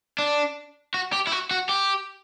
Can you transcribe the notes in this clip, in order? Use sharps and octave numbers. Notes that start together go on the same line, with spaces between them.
D4
F#4
G4
E4
F#4
F#4
G4